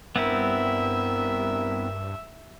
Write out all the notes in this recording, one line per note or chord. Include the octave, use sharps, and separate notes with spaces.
G2 B3 C4 E4 A#4 E5